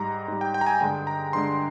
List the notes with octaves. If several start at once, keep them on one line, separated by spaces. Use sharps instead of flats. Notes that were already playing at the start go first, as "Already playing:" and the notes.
Already playing: G#2 G3 A#5
G#2 G3
G5
G5
A#5
G#5
G2 D3 G#3 G5
A#5
G2 D3 G#3 C6